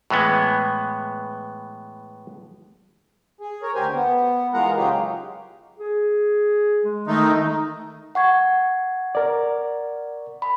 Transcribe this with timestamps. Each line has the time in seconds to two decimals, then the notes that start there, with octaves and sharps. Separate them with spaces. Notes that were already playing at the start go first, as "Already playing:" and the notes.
0.10 A2 E3 G#3 B3
3.39 G#4
3.63 A#4 C#5
3.75 D2 G4 C5 G#5
3.93 B3
4.54 E3 G#3 F4 A#4 F#5 A#5
4.76 C#3 F#3 D#4 F4 G4 G#4
5.79 G#4
6.84 G#3
7.07 D#3 A3 D#4
8.15 F#5 C#6 G#6
9.15 A#4 D5
10.42 B5